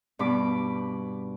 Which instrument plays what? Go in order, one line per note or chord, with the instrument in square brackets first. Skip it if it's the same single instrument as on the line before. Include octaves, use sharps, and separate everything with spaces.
[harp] G2 B2 B5 D6